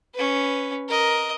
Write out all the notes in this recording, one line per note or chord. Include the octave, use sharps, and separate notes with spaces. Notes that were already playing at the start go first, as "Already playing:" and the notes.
C#4 B4
A#4 D#5